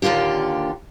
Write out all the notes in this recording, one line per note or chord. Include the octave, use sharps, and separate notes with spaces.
D#2 A#2 D3 F4 G4